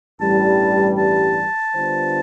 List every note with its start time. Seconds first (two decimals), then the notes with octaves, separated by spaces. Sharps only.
0.21 A1 G2 E3 G3 A5
0.98 A5
1.76 D3 G3 B3 F4 C5